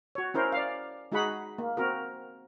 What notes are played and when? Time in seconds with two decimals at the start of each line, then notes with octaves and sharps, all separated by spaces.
0.15 F#4 C#5
0.34 C#4 E4 A#4 C5
0.52 D5 F5
1.12 G#3 D#4 F#4 G#4 F#5 B5
1.58 A#3
1.77 C4 F#4 A#4